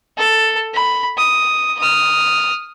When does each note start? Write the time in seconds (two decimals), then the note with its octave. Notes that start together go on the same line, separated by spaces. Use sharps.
0.17 A4
0.75 B5
1.17 D#6
1.79 D#6 F6